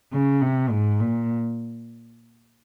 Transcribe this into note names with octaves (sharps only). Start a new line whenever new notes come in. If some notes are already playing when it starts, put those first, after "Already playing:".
C#3
C3
G#2
A#2